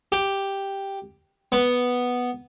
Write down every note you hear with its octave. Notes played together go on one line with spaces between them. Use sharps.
G4
B3